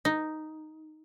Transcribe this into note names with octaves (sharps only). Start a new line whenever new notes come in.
D#4